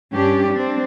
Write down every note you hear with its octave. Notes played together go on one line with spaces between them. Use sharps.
G2 C#4 D4 G4
C4 D4